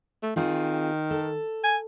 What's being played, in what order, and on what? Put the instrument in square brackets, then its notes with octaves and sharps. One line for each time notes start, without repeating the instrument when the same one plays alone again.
[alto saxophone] A3
[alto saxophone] D#3 [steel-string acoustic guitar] C4 F4 G#4
[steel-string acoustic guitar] A4
[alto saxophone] G#5